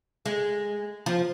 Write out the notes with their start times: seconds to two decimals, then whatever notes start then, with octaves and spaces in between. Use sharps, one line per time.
0.26 G#3
1.06 F3